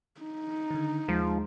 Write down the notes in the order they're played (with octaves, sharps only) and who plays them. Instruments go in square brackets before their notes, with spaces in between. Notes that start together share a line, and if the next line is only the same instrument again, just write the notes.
[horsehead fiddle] D#4
[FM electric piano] D3 D#3
[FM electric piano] D#2 G#3 [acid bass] F3